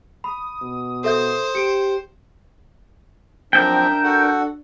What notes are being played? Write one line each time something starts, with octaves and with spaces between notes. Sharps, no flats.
B5 D#6
B2
A4 C5 E5 G6
G4 C#7 D7
F#2 F3 C4 D4 A#4 E5 G5 G6
F#4 A4 F#5